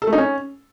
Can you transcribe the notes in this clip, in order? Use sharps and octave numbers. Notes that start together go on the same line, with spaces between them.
A4
A3
D#4
C#4